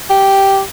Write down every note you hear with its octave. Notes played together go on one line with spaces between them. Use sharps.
G4